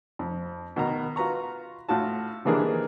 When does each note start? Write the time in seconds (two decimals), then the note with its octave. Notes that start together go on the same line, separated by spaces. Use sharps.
0.19 F2
0.76 B2 D#3 A#5
1.16 F4 F#4 B4 A#5 C#6
1.89 A2 F4 F#4 A5
2.45 C3 D#3 E3 A#3 D4 G#4